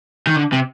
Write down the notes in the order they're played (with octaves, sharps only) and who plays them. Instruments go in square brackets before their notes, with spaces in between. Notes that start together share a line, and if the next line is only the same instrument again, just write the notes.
[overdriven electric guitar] D#3
D3
C3